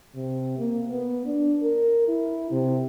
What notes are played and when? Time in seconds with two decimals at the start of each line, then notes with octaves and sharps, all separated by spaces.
0.16 C3
0.59 A#3
0.90 B3
1.26 D4
1.62 A#4
2.08 E4
2.51 C3